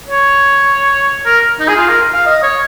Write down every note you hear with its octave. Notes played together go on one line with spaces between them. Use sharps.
C#5
A#4
D#4
G#4
F4
A#4
F5
D#5
C#5